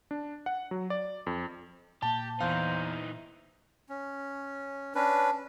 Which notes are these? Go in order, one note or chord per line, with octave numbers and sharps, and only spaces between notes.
D4
F#5
F#3
D5
F2
A#2 A#3 G4 A5
E2 E3 D#4 C5 F5
C#4
C#4 D4 B4